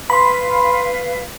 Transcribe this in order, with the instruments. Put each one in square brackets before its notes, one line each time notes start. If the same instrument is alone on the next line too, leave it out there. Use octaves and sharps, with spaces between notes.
[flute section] B4 F5 [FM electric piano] B5 C6